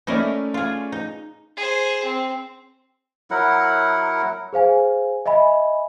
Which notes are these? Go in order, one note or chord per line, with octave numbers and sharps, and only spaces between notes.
A3 C#4 D#4 E4 A#4 D5
F4 G#4
D#4
G#4 C5
C4
F#3 E4 A#4 F#5
G#4 C5 F5 G#5
D#5 E5 G#5 B5